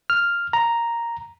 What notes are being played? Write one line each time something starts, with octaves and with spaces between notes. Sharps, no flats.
F6
A#5